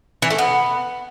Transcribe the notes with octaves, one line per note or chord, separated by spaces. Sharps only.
E3
A3
B3